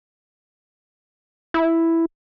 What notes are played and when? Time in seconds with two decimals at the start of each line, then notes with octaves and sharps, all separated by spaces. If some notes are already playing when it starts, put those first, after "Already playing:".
1.54 E4